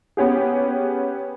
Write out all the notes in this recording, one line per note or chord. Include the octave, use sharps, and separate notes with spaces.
B3 C#4 G4 G#4